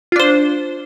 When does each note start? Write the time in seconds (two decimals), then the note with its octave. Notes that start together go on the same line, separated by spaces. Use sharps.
0.12 F4
0.16 D4
0.20 C5